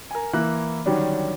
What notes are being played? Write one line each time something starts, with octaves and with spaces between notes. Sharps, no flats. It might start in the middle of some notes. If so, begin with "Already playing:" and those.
A#4 G#5
E3 A#3 E4 F#6
D3 D#3 F#3 G3 C#4 D4